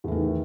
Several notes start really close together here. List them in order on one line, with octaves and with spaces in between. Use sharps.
E2 A3 D#3